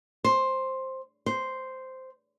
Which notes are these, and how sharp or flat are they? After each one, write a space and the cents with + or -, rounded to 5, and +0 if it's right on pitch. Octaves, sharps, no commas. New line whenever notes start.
C5 +10
C5 -5